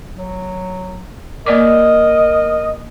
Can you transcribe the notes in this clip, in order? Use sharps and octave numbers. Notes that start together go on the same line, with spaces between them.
F#3
A#3 A#4 D5 D#5 D6